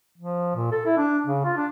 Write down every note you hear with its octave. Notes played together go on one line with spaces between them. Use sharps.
F3
A#2
A4
E4
D4
C#3
F4
D4